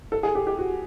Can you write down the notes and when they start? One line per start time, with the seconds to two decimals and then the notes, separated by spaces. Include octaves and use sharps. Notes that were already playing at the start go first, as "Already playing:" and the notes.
0.12 A4
0.23 G#4
0.35 G4
0.47 G4
0.59 F#4